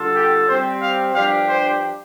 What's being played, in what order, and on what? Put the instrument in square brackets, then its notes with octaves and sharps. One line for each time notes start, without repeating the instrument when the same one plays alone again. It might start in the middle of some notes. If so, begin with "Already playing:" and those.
Already playing: [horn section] D3 G3 F4 A4
[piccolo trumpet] G4
[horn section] G3 C4 G4 [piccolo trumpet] C5
[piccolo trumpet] F5
[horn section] G2 F3 D4 G4 [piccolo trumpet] F5
[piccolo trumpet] C5